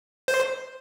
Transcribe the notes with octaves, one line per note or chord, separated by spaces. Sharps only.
C5